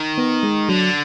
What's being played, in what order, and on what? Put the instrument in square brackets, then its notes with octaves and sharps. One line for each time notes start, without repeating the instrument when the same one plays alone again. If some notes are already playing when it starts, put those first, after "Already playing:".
Already playing: [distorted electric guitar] D#3
[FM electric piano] B3
G#3
[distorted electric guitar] D3 [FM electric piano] F#3